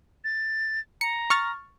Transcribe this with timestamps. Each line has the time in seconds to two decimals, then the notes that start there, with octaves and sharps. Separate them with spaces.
0.24 A6
1.01 A#5 C#7
1.30 C#6 F6 A6